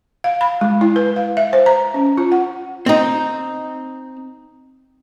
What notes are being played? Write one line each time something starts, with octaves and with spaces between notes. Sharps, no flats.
F5
B5
G#3
E4
B4
F5
E5
C5
A#5
C#4
F4
F#5
C4 D#4